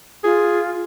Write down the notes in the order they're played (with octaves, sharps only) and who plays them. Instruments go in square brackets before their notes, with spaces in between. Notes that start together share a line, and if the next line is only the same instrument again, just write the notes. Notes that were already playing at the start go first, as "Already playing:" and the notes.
[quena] F4 [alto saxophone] G#4